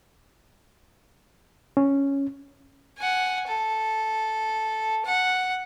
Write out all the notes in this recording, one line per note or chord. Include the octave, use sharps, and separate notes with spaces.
C#4
F#5 G#5
A4
F#5